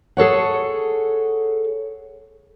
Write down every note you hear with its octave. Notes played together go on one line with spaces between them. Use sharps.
G#4 A4 C#5 F#5